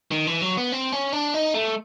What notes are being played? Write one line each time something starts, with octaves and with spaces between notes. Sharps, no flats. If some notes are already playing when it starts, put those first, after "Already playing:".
D#3
E3
F#3
B3
C4
C#4
D4
D#4
A3